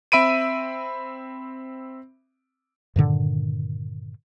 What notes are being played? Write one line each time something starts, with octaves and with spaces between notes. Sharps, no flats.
C4 E5 B5 D7 D#7
G2 A#2 D3 D#3